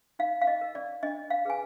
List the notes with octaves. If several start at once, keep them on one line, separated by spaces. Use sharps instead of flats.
D#4 F5
F5
D#5
A#4
D5
D4 D#5
F5
G#4 B4 G#5